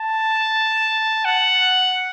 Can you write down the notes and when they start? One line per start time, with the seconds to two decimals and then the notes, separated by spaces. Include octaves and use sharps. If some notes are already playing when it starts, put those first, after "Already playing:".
Already playing: A5
1.25 F#5